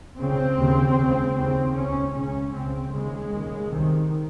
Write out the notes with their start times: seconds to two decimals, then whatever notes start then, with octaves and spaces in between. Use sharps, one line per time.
0.19 C#2 C#3 C4
0.59 D#2 C#3
0.98 C#2 C#3
1.37 D#2 C#3 C4
1.76 C#2 C#3 C#4
2.15 C#2 C#3 C#4
2.54 C#2 C#3 C4
2.94 D#2 C#3 G#3
3.33 D#2 C#3
3.72 C2 C3 D#3